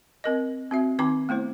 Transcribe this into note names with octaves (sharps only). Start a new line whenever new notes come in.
C4 A#4 D#5
C4 F#4 E5
D#3 C4 D#4 G5 A#5 D6
A3 B3 E4 C5